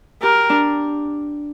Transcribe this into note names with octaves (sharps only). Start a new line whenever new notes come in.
G4 A#4
D4